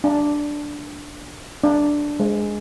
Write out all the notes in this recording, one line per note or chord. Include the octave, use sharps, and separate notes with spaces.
D4
D4
G#3